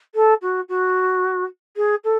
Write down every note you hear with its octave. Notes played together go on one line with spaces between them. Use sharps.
A4
F#4
F#4
G#4
A4